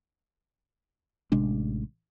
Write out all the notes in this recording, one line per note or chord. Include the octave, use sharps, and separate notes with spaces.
A1 C3 G#3 D4